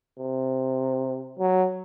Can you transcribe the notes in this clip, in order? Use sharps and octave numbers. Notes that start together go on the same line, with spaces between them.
C3
F#3